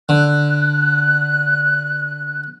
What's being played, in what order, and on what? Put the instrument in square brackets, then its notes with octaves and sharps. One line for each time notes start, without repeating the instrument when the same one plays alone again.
[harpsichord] D3 [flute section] F#6